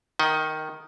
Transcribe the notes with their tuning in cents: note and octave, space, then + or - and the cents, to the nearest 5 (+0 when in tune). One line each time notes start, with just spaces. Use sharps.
D#3 +0 D#5 +30 F#5 +0